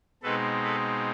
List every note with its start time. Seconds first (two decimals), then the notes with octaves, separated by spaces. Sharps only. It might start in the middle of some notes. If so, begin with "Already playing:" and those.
0.22 B2 G#3 C4 D#4 A4 B4
0.64 A4 B4